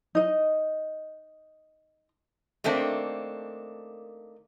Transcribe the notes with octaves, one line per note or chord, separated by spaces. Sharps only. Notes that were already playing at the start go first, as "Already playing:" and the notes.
D#4 D#5
D#3 A3 A#3 C4 D4